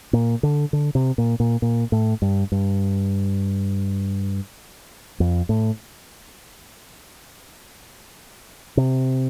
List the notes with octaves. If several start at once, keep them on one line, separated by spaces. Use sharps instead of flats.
A#2
D3
D3
C3
A#2
A#2
A#2
A2
G2
G2
F2
A2
C3